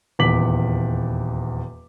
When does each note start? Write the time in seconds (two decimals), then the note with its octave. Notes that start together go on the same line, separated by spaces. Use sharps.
0.19 D#1 E2 D6 B6 F#7